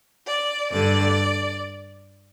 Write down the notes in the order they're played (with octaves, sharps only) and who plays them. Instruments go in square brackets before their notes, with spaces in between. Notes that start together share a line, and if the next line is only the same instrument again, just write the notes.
[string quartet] D5
G2 D3 D5